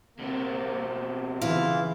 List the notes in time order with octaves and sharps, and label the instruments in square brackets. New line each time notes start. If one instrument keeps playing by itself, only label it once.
[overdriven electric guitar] B2 C4 [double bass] A#3
[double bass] C#3 E3 [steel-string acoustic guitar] E4 F4